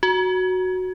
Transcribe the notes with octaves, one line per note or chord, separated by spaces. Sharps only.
F#4